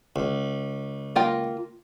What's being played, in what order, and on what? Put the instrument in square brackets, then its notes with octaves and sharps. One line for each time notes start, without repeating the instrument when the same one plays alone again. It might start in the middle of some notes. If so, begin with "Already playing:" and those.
[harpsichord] C#2
[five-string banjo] A#3 F4 G5